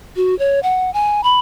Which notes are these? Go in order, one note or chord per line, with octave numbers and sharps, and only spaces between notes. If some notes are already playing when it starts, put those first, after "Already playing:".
F#4
C#5
F#5
G#5
B5